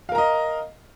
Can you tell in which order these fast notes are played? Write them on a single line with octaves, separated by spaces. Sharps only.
F5 A#4 A#5 D#5